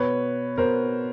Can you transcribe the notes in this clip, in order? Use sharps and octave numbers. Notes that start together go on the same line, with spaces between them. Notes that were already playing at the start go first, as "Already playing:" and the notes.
Already playing: B2 B4 C#5
B2 A#4 C5